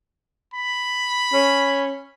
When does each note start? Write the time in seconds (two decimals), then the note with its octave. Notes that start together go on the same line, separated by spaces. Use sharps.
0.54 B5
1.33 C#4